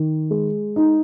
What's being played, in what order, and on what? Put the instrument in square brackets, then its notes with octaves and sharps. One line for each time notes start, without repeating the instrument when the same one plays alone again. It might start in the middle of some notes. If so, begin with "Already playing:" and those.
Already playing: [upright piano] D#3
G#3
D#4